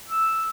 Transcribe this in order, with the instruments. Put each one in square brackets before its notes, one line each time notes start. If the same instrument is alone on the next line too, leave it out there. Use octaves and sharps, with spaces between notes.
[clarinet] E6